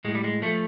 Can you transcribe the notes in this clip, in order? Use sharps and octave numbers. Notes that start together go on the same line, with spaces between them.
A2 G#3
G3
G#3
F3 A3